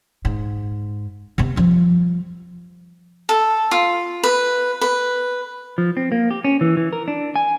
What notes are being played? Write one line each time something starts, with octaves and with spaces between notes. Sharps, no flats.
G#2
C3 B3
F3 G3
A4
F4
B4
B4
F3
C4
A#3
G4
C#4
E3
E3
A#4
D4
G#5